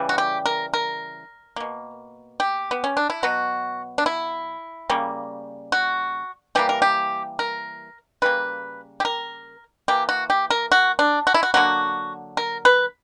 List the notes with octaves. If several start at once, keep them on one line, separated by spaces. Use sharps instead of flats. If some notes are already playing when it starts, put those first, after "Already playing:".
Already playing: C#3 E3 G3
F#4
G4
A#4
A#4
B2 A#3
G4
B3
C#4
D4
E4
B2 F#3 B3 F#4
D4
E4
C#3 G3 A#3
F#4
E3 G3 A#3 G4
A#4
G4
A#4
C#3 G3 A#3 B4
G4
A#4
E3 A#3 G4
F#4
G4
A#4
F#4
D4
F#4
E4
F#4
D3 F#3 A#3 F#4
A#4
B4